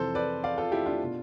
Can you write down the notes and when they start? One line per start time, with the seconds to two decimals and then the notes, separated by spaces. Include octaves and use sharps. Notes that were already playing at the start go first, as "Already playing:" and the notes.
Already playing: F2 C3 E3 A4 C5
0.15 B4 D5
0.44 D5 F5
0.58 F4 A4
0.71 E4 G4
0.86 D4 F4
1.03 B2